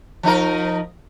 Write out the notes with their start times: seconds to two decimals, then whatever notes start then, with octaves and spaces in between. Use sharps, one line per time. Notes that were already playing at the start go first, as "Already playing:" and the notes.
0.23 F3 D#4 A#4